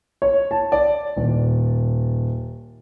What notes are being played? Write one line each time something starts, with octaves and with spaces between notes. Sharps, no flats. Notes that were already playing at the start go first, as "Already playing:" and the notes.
C#5
A5
D5
D#1